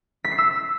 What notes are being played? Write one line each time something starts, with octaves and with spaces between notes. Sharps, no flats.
B6
C7
E6